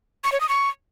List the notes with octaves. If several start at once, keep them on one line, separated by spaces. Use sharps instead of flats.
C#6
C#5
D#6
C#6